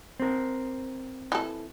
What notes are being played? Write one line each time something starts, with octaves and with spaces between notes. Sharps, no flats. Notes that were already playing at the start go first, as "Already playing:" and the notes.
C4 A#4
E3 A4